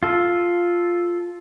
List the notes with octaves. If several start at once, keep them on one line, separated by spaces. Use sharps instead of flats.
F4 A4